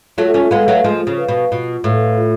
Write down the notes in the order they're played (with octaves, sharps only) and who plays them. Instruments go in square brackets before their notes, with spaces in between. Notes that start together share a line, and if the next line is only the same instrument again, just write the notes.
[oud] F#3 A3 [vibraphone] F4
[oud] A3 C#4
[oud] G#3 B3 [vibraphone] B4 F5
[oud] F#3 A3
[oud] F3 G#3 [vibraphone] F4
[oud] C#3
[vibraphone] B4 F5
[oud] B2
[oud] B2 [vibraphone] F4
[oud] A2 [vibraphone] B4 F5
[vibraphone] F4